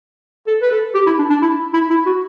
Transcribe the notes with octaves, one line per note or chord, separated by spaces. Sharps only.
A4
B4
A4
G4
E4
D4
D4
E4
E4
E4
F#4